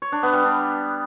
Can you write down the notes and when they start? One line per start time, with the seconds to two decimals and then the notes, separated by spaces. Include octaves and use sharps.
0.02 C#5
0.12 D4
0.23 B3
0.33 G3
0.44 D4